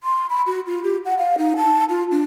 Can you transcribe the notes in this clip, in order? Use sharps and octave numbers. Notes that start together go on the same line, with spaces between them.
C6
B5
F#4
F4
G4
F#5
F5
D#4
A5
F4
D4